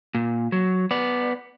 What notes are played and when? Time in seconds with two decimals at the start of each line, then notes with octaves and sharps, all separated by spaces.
0.15 A#2
0.52 F#3
0.91 B3 D5